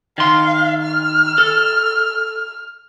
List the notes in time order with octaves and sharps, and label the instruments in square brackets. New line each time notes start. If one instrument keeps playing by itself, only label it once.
[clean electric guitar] D#3 C6 [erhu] F5
[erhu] F6
[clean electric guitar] A4